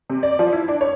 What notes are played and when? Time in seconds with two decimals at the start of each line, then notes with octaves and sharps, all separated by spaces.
0.10 C3
0.23 D5
0.39 F3
0.53 E4
0.68 D4
0.81 C#5